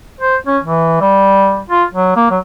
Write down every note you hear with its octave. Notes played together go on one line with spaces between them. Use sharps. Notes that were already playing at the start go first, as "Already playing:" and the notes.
C5
C#4
E3
G3
F4
F#3
A#3
F#3